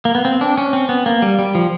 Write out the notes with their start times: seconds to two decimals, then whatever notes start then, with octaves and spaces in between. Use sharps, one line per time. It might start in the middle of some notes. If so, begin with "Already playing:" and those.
0.05 A#3
0.15 B3
0.25 C4
0.41 D4
0.57 C#4
0.73 C4
0.89 B3
1.06 A#3
1.22 G3
1.39 G3
1.55 F3